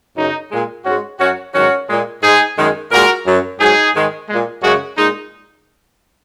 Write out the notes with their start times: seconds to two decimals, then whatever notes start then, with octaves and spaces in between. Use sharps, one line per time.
0.17 F#2 C#3 F#3 D#4
0.51 A#2 G#3
0.85 G#2 G#3 C#4 F#4
1.20 F#2 F#3 C#4 F#4
1.54 G#2 D#3 F#3 C#4 F#4
1.89 A#2 G#3
2.22 G#2 G#3 D#4 G#4
2.57 F#2 D#3 G#3
2.91 A#2 G#3 F#4 A#4
3.25 F#2 F#3
3.60 G#2 F#3 D#4 G#4
3.94 G#2 D#3 G#3
4.28 A#2 G#3
4.62 F#2 C#3 G#3 C#4 F#4
4.97 A#2 G#3 D#4